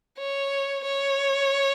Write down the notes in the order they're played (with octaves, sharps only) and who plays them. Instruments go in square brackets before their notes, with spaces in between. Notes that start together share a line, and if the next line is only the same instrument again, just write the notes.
[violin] C#5
C#5